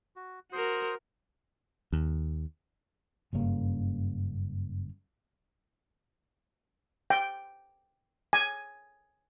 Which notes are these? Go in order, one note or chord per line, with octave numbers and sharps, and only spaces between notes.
F#4
F#4 A#4 C5 C6 D#6
D#2
F#1 G2 C#3 A#3
G5
G#5